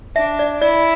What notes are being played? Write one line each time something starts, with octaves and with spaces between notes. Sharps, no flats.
D4 E5
D5
E4 D5